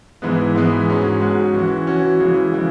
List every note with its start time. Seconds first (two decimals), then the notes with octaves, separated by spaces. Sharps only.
0.22 G#2 E3 G#3 B3
0.54 G#2 E3 G#3 B3
0.88 G#2 G#3 C#4 F#4
1.20 G#2 G#3 C#4 F#4
1.54 E3 C#4 F#4
1.87 E3 C#4 F#4
2.20 C#3 E3 G#3
2.54 C#3 E3 G#3